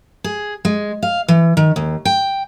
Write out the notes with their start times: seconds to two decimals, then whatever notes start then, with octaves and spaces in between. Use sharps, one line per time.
0.24 G#4
0.65 G#3
1.03 F5
1.28 E3
1.57 D#3
1.76 D#2
2.05 G5